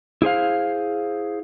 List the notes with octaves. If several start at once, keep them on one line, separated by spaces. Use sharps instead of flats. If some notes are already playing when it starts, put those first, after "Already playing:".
E4 G#4 C5 F5